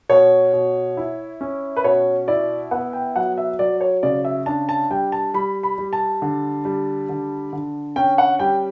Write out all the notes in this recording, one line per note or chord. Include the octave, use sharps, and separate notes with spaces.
B2 C#5
B2
E4
C#4
B4
B2 C#5
E4 D5
B3 F#5
G5
F#3 F#5
E5
F#3 D5
C#5
C#3 D5
E5
D4 A5
A5
G3 G5
A5
G3 B5
B5
G3
A5
D3
G3
D3
D3
C#4 G5
F#5
G3 G5